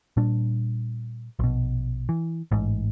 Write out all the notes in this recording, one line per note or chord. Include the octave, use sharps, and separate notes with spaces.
A#2 G3 D4
A#1 B2
E3
A1 G#2